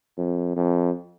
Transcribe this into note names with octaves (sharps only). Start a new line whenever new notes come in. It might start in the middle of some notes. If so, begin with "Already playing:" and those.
F2
F2